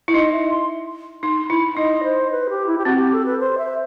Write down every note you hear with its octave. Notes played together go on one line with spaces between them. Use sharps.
E4
D#4 D#5
E5
C6
D#4 C6
E4 B5
D#4 D#5
C5
B4
G4
E4
G4
C4 F#4
G4
A4
B4
C5
E5